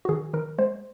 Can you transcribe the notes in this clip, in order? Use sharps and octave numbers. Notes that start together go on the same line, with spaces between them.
F#4
D#3 G#4
D#3 A#4
G#3 C5